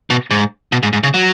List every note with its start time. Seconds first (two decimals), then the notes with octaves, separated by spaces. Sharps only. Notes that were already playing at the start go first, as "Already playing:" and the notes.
0.10 B2
0.31 G#2
0.72 B2
0.83 G#2
0.93 G#2
1.03 C#3
1.14 F#3